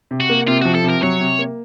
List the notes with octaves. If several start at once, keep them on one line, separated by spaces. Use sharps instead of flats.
C3
F#4
A#3
C3 F4
F3 F#4
A4
C3 A#4
F#3 C#5
C3
A#3